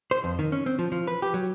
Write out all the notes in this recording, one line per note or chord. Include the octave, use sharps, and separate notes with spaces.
C5
F2
D#3
C#4
C4
F3
F3
B4
G4
F#3